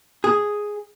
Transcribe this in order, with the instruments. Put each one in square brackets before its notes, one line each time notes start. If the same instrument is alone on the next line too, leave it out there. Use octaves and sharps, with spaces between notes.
[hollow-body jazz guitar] G#4